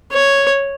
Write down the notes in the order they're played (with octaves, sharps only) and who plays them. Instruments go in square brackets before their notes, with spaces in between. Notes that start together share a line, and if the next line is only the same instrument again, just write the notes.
[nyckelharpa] C#5